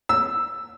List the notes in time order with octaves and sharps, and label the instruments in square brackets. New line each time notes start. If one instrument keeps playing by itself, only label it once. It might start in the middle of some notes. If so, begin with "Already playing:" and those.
[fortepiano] E6